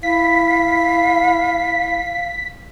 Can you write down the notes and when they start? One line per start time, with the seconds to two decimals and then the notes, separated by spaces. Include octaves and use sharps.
0.03 E4 F5 B6